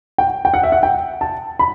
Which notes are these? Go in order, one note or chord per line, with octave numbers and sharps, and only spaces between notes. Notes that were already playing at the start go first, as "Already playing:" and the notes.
G5
G5
F#5
E5
F#5
G5
A5
B5